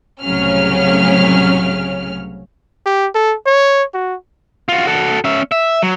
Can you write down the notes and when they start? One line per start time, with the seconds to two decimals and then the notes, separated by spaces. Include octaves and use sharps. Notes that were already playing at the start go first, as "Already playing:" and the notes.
0.21 C2 A2 C#3 F#3 C#4 F6
2.86 G4
3.15 A4
3.46 C#5
3.94 F#4
4.69 F4 F#4
4.87 F#4 A4
5.24 C#4 E5
5.52 E5
5.82 F#3